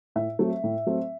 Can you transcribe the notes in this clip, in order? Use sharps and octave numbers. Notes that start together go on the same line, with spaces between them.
A2 E5
F#3 A3 C4
A2
F#3 A3 C4